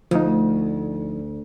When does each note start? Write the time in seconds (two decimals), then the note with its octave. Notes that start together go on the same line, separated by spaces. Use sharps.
0.11 D2 F3 D#4